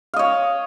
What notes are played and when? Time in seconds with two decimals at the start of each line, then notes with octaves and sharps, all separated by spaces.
0.14 F5
0.16 D#5
0.19 C#5